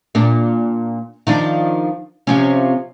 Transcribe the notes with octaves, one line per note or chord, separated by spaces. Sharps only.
A#2 D4
D#3 F3 D4
C3 F3 C#4